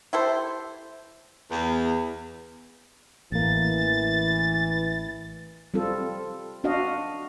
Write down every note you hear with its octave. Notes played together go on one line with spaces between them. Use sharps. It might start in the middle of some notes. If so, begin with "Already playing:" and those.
E4 G4 A4 C5
E2
A1 E3 A#3 A6
G3 C4 F4 A4
D4 F#4 D#5 F5